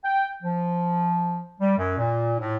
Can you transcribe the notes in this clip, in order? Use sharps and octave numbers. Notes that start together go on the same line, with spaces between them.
G5
F3
G3
F#2
A#2
A2